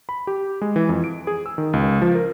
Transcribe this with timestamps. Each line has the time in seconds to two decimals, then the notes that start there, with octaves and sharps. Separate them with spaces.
0.09 B5
0.27 G4
0.61 G#3
0.76 E3
0.89 F2
1.04 D7
1.27 G#4
1.46 E6
1.58 D#3
1.73 C#2
2.02 F3
2.15 A#4